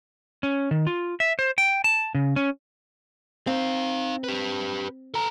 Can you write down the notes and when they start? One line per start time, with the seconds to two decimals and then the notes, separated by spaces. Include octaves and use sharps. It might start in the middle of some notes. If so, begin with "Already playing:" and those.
0.43 C#4
0.71 D#3
0.87 F4
1.20 E5
1.39 C5
1.58 G5
1.84 A5
2.15 C#3
2.36 C#4
3.47 C4 D#4 F5
4.24 G4 B4
5.14 A4 A#5